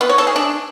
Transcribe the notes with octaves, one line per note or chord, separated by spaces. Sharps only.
B3
C#5
A4
G#4
D4